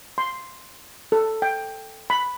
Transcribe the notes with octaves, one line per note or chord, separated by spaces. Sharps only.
C6
A4
G5
B5